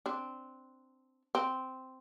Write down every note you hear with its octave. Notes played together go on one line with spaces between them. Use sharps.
C4 D4
C4